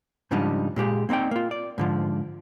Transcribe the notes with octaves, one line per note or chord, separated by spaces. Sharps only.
G#2 C#3 F3 G3 D4 D#4
A#2 G#3 G4 G#4
A#3 C4 D#4 D5 G5
A#3 F4
D5
G#2 D3 F3